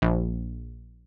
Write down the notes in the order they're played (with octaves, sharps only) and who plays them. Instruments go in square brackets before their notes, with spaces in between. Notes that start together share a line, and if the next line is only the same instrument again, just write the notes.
[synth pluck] A#1